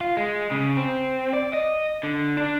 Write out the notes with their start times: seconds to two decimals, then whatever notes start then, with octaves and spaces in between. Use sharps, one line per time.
0.01 F4
0.17 G#3
0.51 C#3
0.77 C4
1.33 D5
1.53 D#5
2.03 D3
2.37 D4